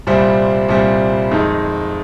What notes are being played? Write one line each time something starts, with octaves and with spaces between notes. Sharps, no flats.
C2 A#2 G3 C4
C2 A#2 G3 C4
F2 D#3 G#3 D#4